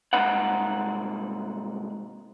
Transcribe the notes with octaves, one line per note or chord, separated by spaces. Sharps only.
C2 G#2 D#4 B4 F#5